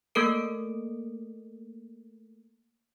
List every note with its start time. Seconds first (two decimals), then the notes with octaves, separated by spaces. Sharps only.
0.15 A3 A#3 A4 A#4 D7